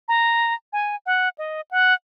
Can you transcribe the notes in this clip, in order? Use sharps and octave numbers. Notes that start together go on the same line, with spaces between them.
A#5
G#5
F#5
D#5
F#5